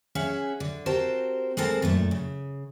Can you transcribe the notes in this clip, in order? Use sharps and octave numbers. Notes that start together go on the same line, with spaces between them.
C#4 G#4 E5 F#5
D3
C4 F#4 G4 A#4 C5 A5
G#3 B3 C4 A4 A#4 A5
F#2 A#2 A3
C#3